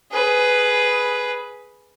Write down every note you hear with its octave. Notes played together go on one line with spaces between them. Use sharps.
G#4 B4